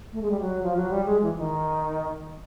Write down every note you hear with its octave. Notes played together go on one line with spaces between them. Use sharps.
A3
G#3
G3
F#3
F3
F#3
G3
G#3
E3
E3
D#3